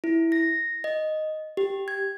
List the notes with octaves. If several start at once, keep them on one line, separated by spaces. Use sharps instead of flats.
E4
A#6
D#5
G4
G#6